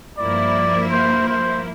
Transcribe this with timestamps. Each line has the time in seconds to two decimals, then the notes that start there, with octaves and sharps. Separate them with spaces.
0.18 G2 F3 A#3 E4 D5
0.91 C5
1.29 C5